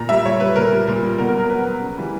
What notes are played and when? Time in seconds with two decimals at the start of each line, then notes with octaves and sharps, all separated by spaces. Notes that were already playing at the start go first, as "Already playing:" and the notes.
Already playing: A#2 A#5
0.09 G3 E5
0.25 A#2 C#5
0.40 G3 B4
0.56 A#2 A#4
0.72 G3
0.87 A#2
1.03 G3
1.18 B2 A#4
1.29 A#4
1.34 F#3
1.40 A#4
1.49 B2 B4
1.65 F#3
1.81 C#3
1.97 E3 G3